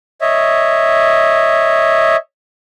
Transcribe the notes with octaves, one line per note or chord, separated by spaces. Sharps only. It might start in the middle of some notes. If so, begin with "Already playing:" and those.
C#5 D#5 E5